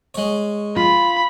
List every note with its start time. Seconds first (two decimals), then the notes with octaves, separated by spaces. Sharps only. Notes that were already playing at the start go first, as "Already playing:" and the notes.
0.14 G#3 C#5
0.76 F4 B5